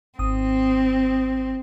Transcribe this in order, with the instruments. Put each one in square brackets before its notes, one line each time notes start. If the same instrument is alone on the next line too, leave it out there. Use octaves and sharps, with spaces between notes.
[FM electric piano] G#1 D#6 [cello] C4